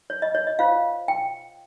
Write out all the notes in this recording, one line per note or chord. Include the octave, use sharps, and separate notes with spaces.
C#5
D#5
C#5
D#5
F4 C5 F5
G5